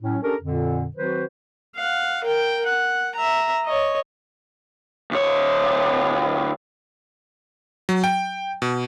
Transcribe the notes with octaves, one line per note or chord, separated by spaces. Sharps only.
A2 F#3 C#4
C#4 D4 G4 A4 A#4
F2 A#2 D3
D#3 F#3 C4 F#4 B4 C5
F5 F#5
A#4 G5
F#5
E5 A#5
C#5 D#5
D2 C#5
F#3
G5
B2